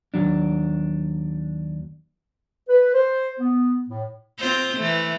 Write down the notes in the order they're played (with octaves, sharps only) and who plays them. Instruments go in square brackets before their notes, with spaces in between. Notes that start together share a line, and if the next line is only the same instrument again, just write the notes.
[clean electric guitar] D#2 F#3 D4
[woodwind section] B4
C5
B3
A2
[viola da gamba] C4 F4 C5
E3 A3